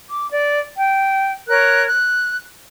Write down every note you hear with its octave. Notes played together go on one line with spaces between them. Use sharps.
D6
D5
G5
A#4 C#5 F#6
F#6